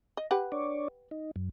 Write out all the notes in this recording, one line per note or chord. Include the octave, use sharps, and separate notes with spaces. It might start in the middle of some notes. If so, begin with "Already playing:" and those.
D#5
G4 B4 F#5
D4 C#5 D5
D#4
F#2